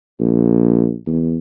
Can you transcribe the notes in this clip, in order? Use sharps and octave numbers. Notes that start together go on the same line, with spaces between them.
A#1
E2